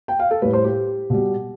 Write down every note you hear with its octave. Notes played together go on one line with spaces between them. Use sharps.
G5
F5
A4
A2 G3 B4
C5
G4
B2 G3